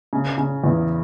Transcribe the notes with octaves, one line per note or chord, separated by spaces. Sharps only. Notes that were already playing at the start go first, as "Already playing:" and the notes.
C#3
C#3
E2